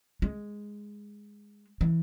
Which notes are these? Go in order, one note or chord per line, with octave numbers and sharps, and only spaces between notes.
G#3
E3